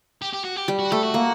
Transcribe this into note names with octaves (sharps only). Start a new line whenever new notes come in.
G4
G4
F#4
G4
G3
F#4
A3 A4
F#4
A#3